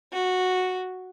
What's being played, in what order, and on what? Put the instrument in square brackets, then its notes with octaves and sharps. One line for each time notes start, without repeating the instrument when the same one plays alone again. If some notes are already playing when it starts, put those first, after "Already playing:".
[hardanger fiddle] F#4